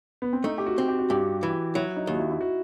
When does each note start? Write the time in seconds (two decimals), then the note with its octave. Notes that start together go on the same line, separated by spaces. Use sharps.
0.22 B3
0.33 C4
0.44 A3 D#4
0.58 G4
0.66 F#4
0.78 C4
0.88 G4
0.99 F#4
1.10 G2 G4
1.43 E3
1.75 F#3 E4
1.96 D#4
2.07 D#2
2.14 F#4
2.19 E4
2.31 E4
2.41 F#4